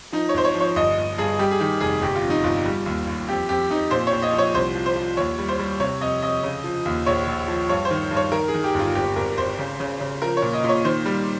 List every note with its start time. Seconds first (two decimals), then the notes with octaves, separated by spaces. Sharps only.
0.12 F3 D#4
0.29 C#5
0.34 G#1 C5
0.45 C#5
0.55 F3
0.60 C#5
0.76 G1 D#5
0.98 G1
1.18 G2 G#4
1.39 G3 G4
1.51 G#4
1.60 D#3 G4
1.80 F1 G#4
2.02 G1 G4
2.16 F4
2.23 F2
2.30 D#4
2.44 G1 F4
2.65 G3
2.86 D#2
3.07 D#2
3.28 F2 G4
3.49 F2 G4
3.70 F2 D#4
3.91 A#2 C5
4.07 C#5
4.13 A#1
4.22 D#5
4.33 F3
4.38 C#5
4.54 C2 C5
4.75 F3
4.86 C5
4.96 F3
5.17 D#2 C#5
5.39 G3
5.49 C5
5.59 G3
5.80 C3 C#5
6.01 F2 D#5
6.23 F2 D#5
6.43 C#3
6.64 F3
6.85 D#2
7.06 A#1 C#5
7.28 A#1
7.48 F3
7.69 G2 C#5
7.85 C5
7.91 D#3
8.11 G2
8.17 C#5
8.32 D#3 A#4
8.48 G#4
8.54 D#3
8.64 G4
8.74 G1 F4
8.95 G#1 G4
9.16 G#1 A#4
9.38 G#1 C5
9.59 C#3
9.80 C#3
10.01 C#3
10.22 F3 A#4
10.37 C#5
10.42 A#2
10.53 D#5
10.64 A#2 C#5
10.84 D#3 C5
11.06 G3